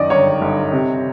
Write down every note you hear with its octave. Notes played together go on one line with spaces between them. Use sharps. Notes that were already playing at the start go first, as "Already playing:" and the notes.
Already playing: F#2 D#3 D5 D#5
G1 C#5
G1
C3